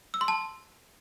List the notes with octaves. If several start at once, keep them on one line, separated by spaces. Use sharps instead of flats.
E6
C6
A5